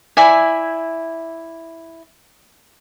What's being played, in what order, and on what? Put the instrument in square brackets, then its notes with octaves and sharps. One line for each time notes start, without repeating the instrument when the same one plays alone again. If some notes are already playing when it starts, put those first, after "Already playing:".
[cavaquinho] E4 D5 E5 G#5